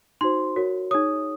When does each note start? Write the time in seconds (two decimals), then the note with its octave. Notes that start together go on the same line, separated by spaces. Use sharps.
0.21 D#4 F#4 C5 C6
0.56 F#4 A#4 C#5
0.91 D#4 G#4 C#5 D#6